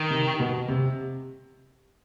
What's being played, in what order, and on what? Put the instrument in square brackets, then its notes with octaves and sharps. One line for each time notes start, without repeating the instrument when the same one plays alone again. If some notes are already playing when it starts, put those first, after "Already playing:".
Already playing: [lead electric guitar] D#3
[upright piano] C3
B2
C3